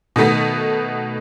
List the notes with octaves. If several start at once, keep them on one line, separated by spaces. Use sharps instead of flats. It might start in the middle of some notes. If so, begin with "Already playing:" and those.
B2 D#3 A3 B3